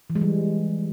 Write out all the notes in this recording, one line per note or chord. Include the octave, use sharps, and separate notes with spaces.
E3
G#3
G3